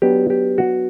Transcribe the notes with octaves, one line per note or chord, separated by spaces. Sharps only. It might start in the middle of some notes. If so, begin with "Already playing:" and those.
F#3 B3 D4 G4
G4
F#4